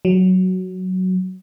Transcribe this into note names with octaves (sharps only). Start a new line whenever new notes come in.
F#3